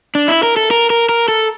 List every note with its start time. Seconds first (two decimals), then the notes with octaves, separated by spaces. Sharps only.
0.15 D4
0.28 E4
0.43 A#4
0.56 A4
0.71 A#4
0.90 A#4
1.09 A#4
1.28 A4